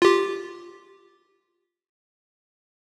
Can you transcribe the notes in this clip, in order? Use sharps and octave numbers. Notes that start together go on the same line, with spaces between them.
F4 G4